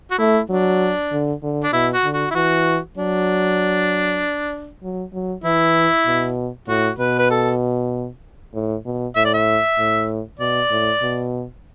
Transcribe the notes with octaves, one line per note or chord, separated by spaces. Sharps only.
F#4
A3 E4
F#3 D4
D3
D3
D4
B2 E4
F#4
D3
F#4
E4
E3 F#4
F#3 D4
F#3
F#3
E3 E4
B2
A2 F#4
B2 B4
B4
A4
A2
B2
A2 E5
D5
E5
A2
B2 D5
A2
B2